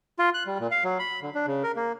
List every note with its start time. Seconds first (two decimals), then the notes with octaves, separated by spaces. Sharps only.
0.19 F4
0.34 F#6
0.46 G3
0.59 A#2
0.71 F5
0.84 F#3
0.99 B5
1.22 D3
1.35 D4
1.46 C#3
1.63 A#4
1.76 A#3